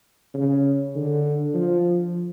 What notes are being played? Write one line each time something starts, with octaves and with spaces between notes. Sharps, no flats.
C#3
D3
F3